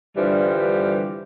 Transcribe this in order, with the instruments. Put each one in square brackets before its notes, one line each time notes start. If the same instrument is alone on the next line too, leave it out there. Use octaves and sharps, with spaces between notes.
[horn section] G2 D3 E3 F3 G3